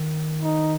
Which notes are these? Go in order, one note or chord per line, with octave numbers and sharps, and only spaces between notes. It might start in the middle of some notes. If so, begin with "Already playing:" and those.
Already playing: D#3
D#4